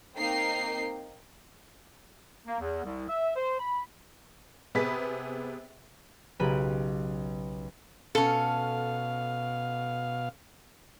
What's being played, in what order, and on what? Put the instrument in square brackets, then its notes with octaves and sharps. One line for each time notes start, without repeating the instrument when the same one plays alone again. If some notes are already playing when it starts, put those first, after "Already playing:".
[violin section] A#3 C4 D#4 G5 C7
[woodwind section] A#3
E2
C2
E5
C5
B5
[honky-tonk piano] C3 B3 G#4 B4 B6
[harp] B1 C#3 G4 B4 B5 D#7
[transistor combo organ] B2 F5 [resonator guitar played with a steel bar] C#4 A4